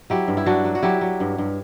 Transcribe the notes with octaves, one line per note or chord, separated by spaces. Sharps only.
F#3 E4 G4
G2
E4
F#3 D4 F#4
F#3
F#4
F#3 E4 G4
F#3
G2
G2